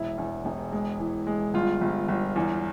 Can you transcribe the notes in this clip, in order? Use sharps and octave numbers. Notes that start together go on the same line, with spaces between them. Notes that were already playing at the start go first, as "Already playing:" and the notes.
Already playing: E1 E4
E2
E1
G#3
E3
G#3
G1 F4
G1
G1
E2